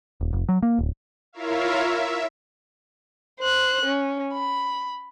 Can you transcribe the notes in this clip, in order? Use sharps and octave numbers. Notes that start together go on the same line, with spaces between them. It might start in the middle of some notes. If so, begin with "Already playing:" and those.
D#1
F1
F#3
A#3
D1
E4 F4 A#4 C#5 E5 F5
E5
C5 F#6
C#4
B5